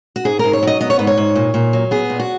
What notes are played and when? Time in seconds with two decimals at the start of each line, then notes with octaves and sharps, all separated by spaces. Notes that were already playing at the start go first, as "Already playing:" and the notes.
0.16 F#4
0.25 G#2 G#4
0.39 G#2 A#4
0.53 C#5
0.63 F#3 D#5
0.81 B3 D#5
0.90 C#5
0.99 G#2 B4
1.07 C#5
1.18 G#2
1.35 A#2
1.54 A#2
1.73 F#3
1.91 B3 G#4
2.10 A#2
2.19 F#4